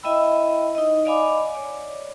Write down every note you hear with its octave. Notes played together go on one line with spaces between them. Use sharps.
E4 D#5 E5 G5 B5 E6
D#4 D#5
D5 D#5 F5 G#5 B5 D6
C#5 D5